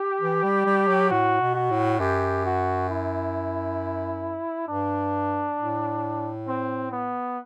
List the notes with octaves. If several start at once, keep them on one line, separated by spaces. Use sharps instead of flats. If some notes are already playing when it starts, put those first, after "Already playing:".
Already playing: G4
E3
G3
G3
F#3
A2 F#4
B2
F#4
A2
F#2 G4
F#4
E4
G2 D4
A2
C4
B3